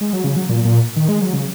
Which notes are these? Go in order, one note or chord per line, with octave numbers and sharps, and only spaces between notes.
G#3
F#3
C#3
F#3
A#2
A#2
D#3
G#3
F#3
C#3